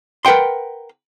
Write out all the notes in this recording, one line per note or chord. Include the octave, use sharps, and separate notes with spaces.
A#4 B4 F#5 G5 C6